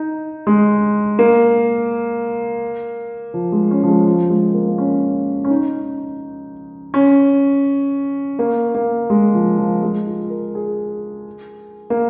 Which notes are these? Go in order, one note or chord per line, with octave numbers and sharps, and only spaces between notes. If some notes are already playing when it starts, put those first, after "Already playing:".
Already playing: D#4
G#3
A#3
F3
G#3
C#4
F3
G#3
F3
G#3
A#3
A#3
C#4
C#4
D#4
C#4
A#3
A#3
G#3
F3
F3
G#3
F4
A#4
G#4
A#3